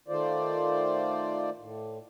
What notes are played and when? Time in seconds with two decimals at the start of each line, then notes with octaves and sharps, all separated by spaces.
0.08 D#3 A3 F4 C5 D5
1.58 A2